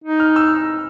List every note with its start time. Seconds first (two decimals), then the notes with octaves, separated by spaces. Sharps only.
0.04 D#4
0.20 F6
0.36 E6